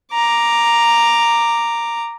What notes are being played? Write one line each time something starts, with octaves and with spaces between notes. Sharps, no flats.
A#5 D6